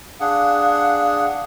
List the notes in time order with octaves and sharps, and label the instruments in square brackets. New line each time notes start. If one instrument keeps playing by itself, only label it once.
[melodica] D4 G#4 F#5 [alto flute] F5